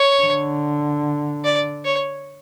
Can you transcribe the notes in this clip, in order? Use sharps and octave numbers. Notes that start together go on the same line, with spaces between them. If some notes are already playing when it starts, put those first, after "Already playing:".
Already playing: C#5
D3
D5
C#5